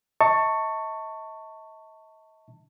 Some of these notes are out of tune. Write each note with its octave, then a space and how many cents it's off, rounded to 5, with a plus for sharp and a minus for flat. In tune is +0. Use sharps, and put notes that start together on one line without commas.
D#5 +45 A5 +25 C#6 +0